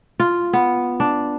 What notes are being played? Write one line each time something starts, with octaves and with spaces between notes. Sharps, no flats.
F4
B3
D4